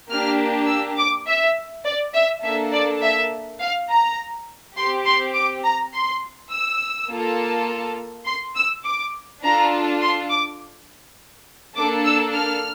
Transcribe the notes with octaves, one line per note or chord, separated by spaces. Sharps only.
A#3 D4 G4 F6
E6
D6
E5
D5
E5
A#3 D4 A4 E5
D5
E5
F5
A#5
C4 G4 C6
C6
D6
A#5
C6
E6
A#3 F4 A4
C6
E6
D6
D4 F4 A4 A#5
C6
D6
A#3 D4 A4 D6
E6
F6